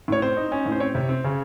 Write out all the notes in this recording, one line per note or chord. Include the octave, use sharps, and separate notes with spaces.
A2 C#5
C4 C5
D#4
C#4
A2
C5
C4 C#5
C3
C4
C#3